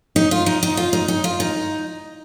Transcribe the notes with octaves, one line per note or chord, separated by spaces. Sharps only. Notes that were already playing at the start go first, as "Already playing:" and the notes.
D#4
F4
D#4
D#4
F4
D#4
D#4
F4
D#4